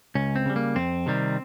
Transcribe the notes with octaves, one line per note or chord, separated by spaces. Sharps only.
C#2 C#4
C4
C#3 G3
A#3
F2 C4
C3 D#3 G3